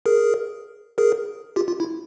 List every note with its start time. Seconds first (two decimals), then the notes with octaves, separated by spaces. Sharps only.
0.06 G#4 A#4
0.98 G#4 A#4
1.56 F4 G4
1.68 F4
1.80 E4